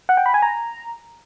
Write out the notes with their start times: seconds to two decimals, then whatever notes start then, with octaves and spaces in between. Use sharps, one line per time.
0.09 F#5
0.17 G5
0.26 B5
0.34 G#5
0.42 A#5